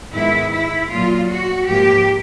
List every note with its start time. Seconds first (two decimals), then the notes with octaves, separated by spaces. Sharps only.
0.12 G#2 D#3 G#3 B3 E4
0.51 E4
0.90 A#2 F#3 A#3 F4
1.28 F#4
1.67 G#2 F3 A#3 G4